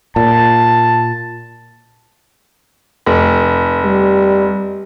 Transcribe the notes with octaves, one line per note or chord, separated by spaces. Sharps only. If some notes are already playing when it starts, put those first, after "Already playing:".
A#2 A5
F1
G3